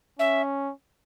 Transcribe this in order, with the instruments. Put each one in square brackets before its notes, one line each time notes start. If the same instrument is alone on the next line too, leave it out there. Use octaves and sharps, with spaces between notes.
[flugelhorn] C#4 [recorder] E5